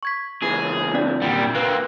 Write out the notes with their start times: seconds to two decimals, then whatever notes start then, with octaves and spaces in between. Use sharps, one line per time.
0.03 C#6 G#6 B6
0.43 C#2 E3 G#4
0.94 C4 D4 D5
1.22 D2 A#2 G3 F#5
1.55 A#3 C4 B4 F#6